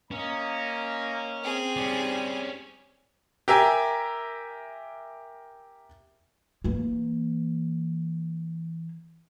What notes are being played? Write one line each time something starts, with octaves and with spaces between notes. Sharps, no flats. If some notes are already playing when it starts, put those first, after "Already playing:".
A#3 C#4 D#5 A#5
C4 G#4
G3 C#4 D5
G4 A#4 E5 G#5
E3 A#3